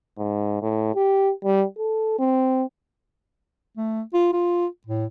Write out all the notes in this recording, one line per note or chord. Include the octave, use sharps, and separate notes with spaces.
G#2
A2
G4
G3
A4
C4
A3
F4
F4
A2